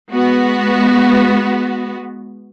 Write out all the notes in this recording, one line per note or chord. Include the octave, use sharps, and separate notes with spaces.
G#3 B3 F#4